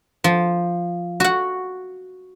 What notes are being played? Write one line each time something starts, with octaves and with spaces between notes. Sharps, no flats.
F3
F#4 F#5